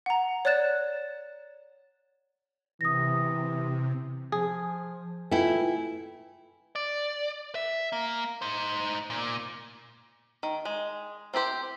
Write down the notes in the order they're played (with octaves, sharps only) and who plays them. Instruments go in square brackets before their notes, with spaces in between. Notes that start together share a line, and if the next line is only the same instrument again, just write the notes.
[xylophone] F#5 A#5
C#5 D5 F#6 A6 E7
[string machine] C3 [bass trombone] E3 [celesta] D#6 A#6
[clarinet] F3 [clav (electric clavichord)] G#4
[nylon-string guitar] A3 E4 [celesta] F4 B4 G5 [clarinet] G#5
[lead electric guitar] D5
E5
A#3
D#4 C5
A#2
[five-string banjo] D#3
G#3
C4 E4 G4 C5